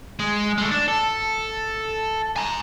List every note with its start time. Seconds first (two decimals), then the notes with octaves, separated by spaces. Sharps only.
0.19 G#3
0.58 G#3 A3
0.71 D4
0.88 A4
2.36 G#5 A#5